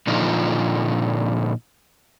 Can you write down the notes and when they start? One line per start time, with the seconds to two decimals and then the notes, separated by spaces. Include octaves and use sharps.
0.07 A#2 D3 F3 D#4 F4